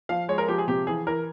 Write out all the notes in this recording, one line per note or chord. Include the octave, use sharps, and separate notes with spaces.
F3 F5
G#3 C#5
A#4
F3 G4
G#4
C3 G4
E3 G#4
E3 A#4